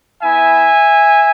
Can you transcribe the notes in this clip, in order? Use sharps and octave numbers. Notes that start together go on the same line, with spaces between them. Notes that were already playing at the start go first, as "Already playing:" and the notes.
B3 E4 E5 G#5